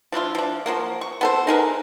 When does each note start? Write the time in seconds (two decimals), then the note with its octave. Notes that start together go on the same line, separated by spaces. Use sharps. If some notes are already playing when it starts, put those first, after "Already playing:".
0.12 F3 D4 E4 F4
0.35 F3 D4
0.66 F3 F#3 A#3
1.01 C#6
1.21 B3 A4 C5
1.47 D#4 G#4 A#4 B4